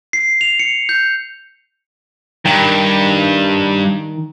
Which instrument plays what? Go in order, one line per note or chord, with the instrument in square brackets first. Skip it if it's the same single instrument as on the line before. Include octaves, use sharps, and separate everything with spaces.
[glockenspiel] C7
F7
C#7
G6
[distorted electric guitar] G2 [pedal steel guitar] D#3 G5 A#5